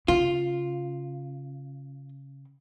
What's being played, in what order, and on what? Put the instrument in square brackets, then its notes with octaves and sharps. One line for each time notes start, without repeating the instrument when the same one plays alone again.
[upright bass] C#3 [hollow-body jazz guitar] F4